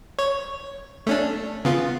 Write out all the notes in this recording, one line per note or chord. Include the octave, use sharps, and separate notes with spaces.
C#5
A3 C#4 D4
C#3 B3 F4